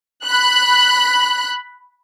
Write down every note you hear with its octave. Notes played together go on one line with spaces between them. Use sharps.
B5 F#6